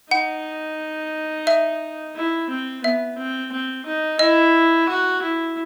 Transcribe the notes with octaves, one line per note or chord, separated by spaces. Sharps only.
D#4 F#5
E5
E4
C4
B3 E5
C4
C4
D#4
E4 D#5
F#4
E4